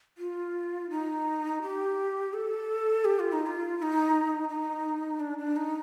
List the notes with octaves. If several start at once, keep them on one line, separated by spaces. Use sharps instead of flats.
F4
D#4
G4
A4
G4
F4
D#4
F4
F4
D#4
D#4
D4
D4
D#4